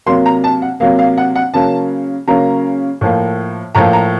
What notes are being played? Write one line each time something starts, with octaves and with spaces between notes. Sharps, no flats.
C3 F#3 A#3 C6
A#5
A5
F#5
C3 F#3 A#3 F5
F5
F#5
F#5
C#3 F#3 A#3 A5
C#3 F#3 A#3 A#5
A2 F3 A#3
A2 F3 A#3 A#5
A#5